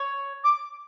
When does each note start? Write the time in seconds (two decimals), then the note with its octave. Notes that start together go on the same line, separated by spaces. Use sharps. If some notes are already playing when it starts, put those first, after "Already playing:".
Already playing: C#5
0.44 D6